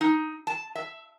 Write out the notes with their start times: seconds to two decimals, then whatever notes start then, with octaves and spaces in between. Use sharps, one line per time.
0.01 D#4
0.47 A5
0.75 E5